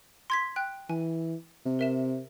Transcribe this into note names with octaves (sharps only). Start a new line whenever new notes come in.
C6 G#6 B6
G5 F#6
E3 G#5
C3
A#4 E5 E7